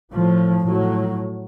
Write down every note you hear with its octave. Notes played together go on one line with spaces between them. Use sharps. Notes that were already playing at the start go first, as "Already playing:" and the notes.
A2 F3
A2 F#3